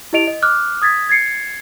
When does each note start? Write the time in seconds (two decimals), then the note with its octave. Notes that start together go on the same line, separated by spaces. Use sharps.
0.13 E4 G4 D#5 D7 F7
0.27 D#5
0.42 D6 F6 F#6
0.82 D#6 G#6 A6 B6
1.09 G#6 A6 C7 C#7